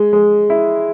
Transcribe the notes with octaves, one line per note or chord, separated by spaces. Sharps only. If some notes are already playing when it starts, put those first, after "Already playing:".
Already playing: G#3
G#3
E4